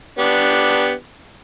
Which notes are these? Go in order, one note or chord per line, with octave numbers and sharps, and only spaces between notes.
B3 D4 G4